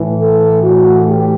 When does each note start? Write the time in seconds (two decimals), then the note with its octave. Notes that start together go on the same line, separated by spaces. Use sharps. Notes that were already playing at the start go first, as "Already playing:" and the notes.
Already playing: A2 E3
0.20 A4
0.62 F#4
1.06 G4